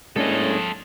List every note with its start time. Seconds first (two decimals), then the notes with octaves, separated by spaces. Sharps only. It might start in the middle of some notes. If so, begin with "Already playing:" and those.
0.16 A2 G#3 A#3 C#4 D4 A4 D#5